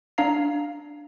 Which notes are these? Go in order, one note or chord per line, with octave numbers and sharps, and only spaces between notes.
D4 F5 A#5 C7